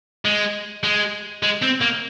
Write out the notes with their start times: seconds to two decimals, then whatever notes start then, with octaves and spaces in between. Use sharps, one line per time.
0.25 G#3
0.84 G#3
1.43 G#3
1.63 C4
1.82 A#3